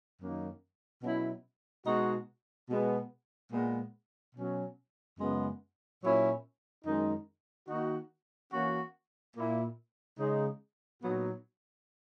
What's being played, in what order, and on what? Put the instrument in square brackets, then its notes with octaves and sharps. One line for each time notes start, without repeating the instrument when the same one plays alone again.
[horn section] F#2 D#3 F#3 A#3 D#4
B2 F#3 C#4 E4
B2 G#3 D#4 F#4
B2 G#3 B3
A#2 G#3 B3
B2 F#3 C#4
F#2 C#3 G#3 B3
A#2 F#3 C#4 E4
F#2 D#3 G#3 D#4
D#3 A#3 D#4 F#4
E3 A#3 C#4 F#4
A#2 A#3 E4
C#3 G#3 D#4
A#2 F#3 B3 D#4 F#4